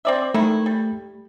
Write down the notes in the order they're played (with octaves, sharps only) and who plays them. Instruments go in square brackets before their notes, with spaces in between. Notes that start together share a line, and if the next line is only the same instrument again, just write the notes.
[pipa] C4 D5 E5
[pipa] D#3 E4 [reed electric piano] A3
[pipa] G3